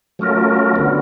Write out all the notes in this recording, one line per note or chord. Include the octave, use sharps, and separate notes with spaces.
F#3 A3 C#4 F4 A#4
D3 F#3 B3